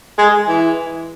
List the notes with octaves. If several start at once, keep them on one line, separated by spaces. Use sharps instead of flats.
G#3
E3